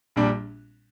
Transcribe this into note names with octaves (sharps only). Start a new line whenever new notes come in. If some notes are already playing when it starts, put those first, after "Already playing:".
A#1 A#2 G3 D4